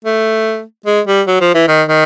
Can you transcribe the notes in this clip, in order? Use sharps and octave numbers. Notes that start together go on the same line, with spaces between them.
A3
G#3
G3
F#3
F3
E3
D#3
D#3